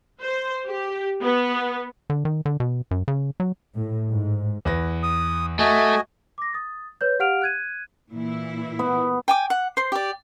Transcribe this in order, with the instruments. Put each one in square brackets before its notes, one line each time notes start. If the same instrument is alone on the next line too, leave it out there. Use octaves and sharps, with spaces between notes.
[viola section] C5
G4
B3
[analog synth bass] D3
D#3
D3
B2
F#2
C#3
F#3
[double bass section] A2
G#2
[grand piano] E2 B4 A#6
[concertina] D#6
[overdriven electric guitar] A3 [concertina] F#4 D#5 G#5
[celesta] D6 A#6
D#6 A6
B4 C#5 G6
G4 F5 F#5 F6 D7 F7
F#6 G#6 D#7
[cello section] A#2 E3 E4
[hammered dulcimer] B3
[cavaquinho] G5 G#5 D6
F#5
C5 C6
G4 D5